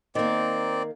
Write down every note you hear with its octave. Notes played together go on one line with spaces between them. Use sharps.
D#3 A#3 C4 D5